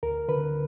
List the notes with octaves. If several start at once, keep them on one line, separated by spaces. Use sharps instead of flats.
D2 A#4
D3 B4